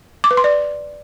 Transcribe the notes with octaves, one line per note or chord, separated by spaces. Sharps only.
D6
B4
C6
D5